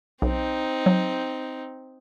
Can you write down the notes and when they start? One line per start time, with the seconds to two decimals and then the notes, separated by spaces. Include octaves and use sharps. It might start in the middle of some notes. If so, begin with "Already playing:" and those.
0.22 B1 C4 D#4
0.86 F#3